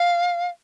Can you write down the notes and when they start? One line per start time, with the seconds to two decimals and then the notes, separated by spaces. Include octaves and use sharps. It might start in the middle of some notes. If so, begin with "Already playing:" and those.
Already playing: F5